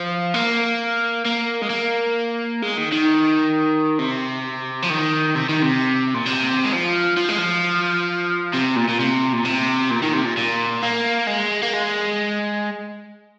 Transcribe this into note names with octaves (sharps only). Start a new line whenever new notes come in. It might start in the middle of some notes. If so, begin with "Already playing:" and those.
Already playing: F3
A#3
A#3
G#3
A#3
G#3
D#3
D#3
C3
F3
D#3
C3
D#3
C3
A#2
C3
G#3
F3
F3
G#3
F3
C3
A#2
A#2
C3
A#2
C3
A#2
D#3
C3
A#2
A#2
A#3
G#3
A#3
G#3